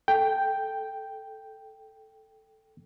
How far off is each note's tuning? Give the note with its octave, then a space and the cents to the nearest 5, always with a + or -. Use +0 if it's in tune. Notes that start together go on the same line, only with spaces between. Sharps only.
A4 +0 G5 +0